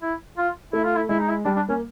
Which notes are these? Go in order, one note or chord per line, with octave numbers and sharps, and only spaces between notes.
E4
F4
A3 E4
F4
E4
G#3 E4
D#4
E4
G3 D4
D4
A#3 C#4